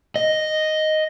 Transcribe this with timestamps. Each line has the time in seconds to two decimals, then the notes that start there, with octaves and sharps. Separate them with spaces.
0.16 D#5